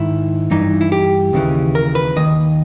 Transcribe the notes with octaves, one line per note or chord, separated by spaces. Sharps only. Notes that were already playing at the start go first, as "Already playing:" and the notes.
Already playing: G#2 D#3 E4
G2 E3 D#4
E4
G4
D#2 C#3 E3
A#4
B4
D#2 D#3 D#5